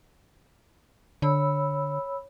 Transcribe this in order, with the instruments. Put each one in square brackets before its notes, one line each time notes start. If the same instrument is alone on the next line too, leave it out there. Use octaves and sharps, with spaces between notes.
[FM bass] D3 [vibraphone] C#5 B5 E6